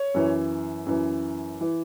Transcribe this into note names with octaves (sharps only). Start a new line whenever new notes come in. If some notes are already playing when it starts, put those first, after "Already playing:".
Already playing: C#5
F#2 E3
F#2 E3
E3